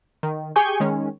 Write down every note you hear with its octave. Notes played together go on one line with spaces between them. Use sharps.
D#3
G4 G#4 G5 G#5 C#6 G6
D#3 G#3 C#4